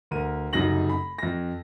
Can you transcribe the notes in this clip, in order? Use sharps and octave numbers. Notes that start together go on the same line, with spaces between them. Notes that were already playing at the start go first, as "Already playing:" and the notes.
D2 A#4 D#7
F1 F#2 C#3 D#4 A#6 F#7
B5
F2 A#6